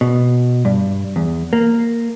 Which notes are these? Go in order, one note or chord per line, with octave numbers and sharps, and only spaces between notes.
B2
G2
E2
A#3